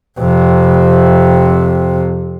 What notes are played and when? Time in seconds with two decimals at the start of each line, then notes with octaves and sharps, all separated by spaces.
0.19 F2 C3